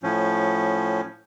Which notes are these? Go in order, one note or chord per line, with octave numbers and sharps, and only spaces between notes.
A2 F3 C#4